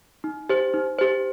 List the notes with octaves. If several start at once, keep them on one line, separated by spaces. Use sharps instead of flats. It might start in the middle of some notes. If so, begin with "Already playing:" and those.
D#4
G4 C5
D#4
G4 C5